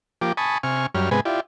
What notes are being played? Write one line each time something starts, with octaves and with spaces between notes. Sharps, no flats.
F3 A#3 G4 D6
G#5 A5 B5 C#6 D#6
C3 G#5 C#6 F6
F#2 G3 C#5 F6
G#2 C3 G#3 B3 B4 G#5
E4 F4 G4 D5